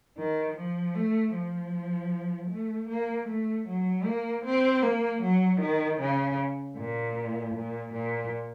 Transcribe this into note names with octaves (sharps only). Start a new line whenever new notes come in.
D#3
F3
A3
F3
A3
A#3
A3
F#3
A#3
C4
A#3
F#3
D#3
C#3
A#2
A#2
A#2